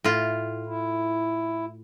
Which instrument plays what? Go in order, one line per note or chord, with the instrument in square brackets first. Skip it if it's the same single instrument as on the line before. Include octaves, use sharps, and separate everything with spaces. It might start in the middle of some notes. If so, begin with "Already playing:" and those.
[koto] A2 F4
[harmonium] E4